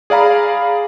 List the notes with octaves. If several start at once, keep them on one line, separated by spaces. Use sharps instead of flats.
G#4 D5 F5 A#5 B5